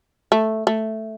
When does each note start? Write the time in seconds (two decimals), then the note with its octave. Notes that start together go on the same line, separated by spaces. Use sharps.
0.32 A3
0.67 A3